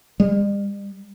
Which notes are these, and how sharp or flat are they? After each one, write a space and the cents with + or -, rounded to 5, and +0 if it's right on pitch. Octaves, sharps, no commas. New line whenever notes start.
G3 +40